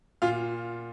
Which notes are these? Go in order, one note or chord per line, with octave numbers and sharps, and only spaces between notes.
A#2 F4 F5